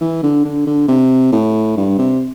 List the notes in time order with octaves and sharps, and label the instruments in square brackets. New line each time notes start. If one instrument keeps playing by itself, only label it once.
[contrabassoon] E3
D3
D3
D3
C3
A2
G2
C3